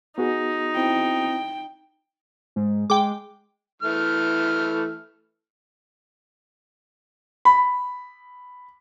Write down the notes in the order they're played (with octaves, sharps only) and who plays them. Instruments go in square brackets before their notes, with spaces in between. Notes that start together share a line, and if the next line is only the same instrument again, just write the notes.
[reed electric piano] B3 F#4 G#4 [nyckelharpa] D#4
[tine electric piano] C4 E4 [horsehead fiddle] G5
[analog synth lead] G#2
[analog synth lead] G#3 [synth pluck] G5 D6
[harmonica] E3 A3 F6
[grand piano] B5